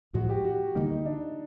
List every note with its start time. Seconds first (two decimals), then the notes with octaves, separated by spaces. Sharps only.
0.13 A1 A2 F3 G#3 F#4
0.29 G4
0.44 F#4
0.75 D2 D3 G3 A#3 D#4
1.06 D4